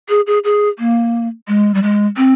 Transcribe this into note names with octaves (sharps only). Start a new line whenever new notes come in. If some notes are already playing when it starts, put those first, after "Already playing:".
G#4
G#4
G#4
A#3
G#3
G3
G#3
C4